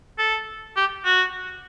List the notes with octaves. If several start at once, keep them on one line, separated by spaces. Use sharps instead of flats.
A4
G4
F#4